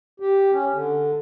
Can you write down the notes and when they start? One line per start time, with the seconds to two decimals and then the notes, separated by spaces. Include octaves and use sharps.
0.20 G4
0.52 C#4
0.73 D3